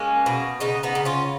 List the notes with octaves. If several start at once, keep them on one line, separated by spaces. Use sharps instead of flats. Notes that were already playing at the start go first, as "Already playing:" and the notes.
Already playing: G#3 A#3 C#4
B2
C#3 B3 D#4
B3 D#4
C#3
C#4 F4